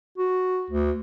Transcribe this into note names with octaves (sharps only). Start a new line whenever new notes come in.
F#4
D2